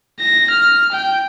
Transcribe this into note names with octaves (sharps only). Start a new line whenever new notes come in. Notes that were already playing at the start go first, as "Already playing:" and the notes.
A#6
F6
G5